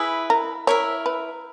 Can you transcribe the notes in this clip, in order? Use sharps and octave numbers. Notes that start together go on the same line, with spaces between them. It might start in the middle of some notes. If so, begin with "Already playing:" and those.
Already playing: E4 G#4 B4 E5
A#4
E4 A#4 C#5 E5
B4